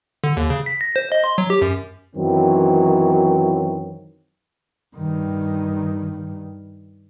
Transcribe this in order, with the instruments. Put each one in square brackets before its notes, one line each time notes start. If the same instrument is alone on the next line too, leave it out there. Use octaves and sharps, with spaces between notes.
[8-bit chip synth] D3
D#2
C#3
B6
A#6
C5
D#5
C6
F#3
G4
F#2
[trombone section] F#2 D#3 E3 F#3 C4
[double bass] G2 D#3